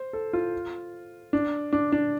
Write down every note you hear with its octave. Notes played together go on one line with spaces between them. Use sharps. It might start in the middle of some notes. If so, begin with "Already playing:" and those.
Already playing: C5
A4
F4
D4
D4
D4